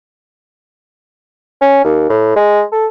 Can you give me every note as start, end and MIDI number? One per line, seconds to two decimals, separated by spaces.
1.61 1.84 61
1.84 2.07 39
2.10 2.33 45
2.36 2.63 56
2.72 2.86 69